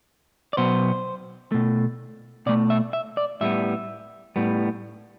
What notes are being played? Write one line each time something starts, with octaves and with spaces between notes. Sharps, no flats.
D5
B2 F#3 B3 C5
B2 A3
B2 A3 D5
E5
E5
D5
A2 G3 B3 E5
A2 G3 B3